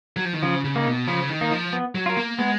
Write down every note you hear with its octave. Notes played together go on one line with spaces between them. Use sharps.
F#3
F3
D#3
C#3 F3
C#3
A#3 D#4
B2
C#3 F3
D#3
A#3 D#4
F3
B3
F#3
F4 A#4
A#3
G#3 B3